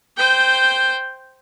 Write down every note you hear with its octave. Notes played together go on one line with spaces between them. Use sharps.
C5 G5